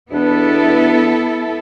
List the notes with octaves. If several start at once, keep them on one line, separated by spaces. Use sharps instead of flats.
E2 B2 B3 D4 E4 A4